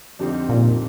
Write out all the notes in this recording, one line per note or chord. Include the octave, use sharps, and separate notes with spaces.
F2 D3 G3 C4 D#4
A#2